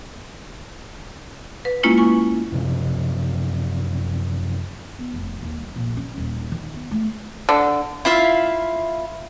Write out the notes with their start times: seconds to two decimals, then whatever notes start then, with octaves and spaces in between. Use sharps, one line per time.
1.65 B4
1.83 G#3 A#3 C#4 E4 F4
1.98 G#5 C#6
2.52 F#2 C3 F3
4.98 B3
5.14 F1
5.42 D#2
5.59 G3
5.76 A#1
5.97 C#4
6.18 D#1
6.52 D#3
6.74 B3
6.91 A3
7.49 D3
8.05 E4 F4 E5 F5